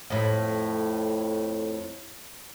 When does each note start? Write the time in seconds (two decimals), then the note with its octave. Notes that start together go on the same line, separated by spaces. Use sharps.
0.10 F2 A2